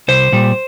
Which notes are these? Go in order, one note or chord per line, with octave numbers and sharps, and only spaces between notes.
C2 C5
A#2 G3